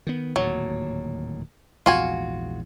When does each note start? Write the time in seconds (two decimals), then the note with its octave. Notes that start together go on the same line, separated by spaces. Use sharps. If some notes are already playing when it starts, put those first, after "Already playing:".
0.07 D#3 B3
0.36 D1 D#2 A#2 F#3
1.86 A#1 E2 G#2 F4 F#4 G#5